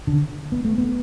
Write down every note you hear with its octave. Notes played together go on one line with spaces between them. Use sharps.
D3
B3
A3
B3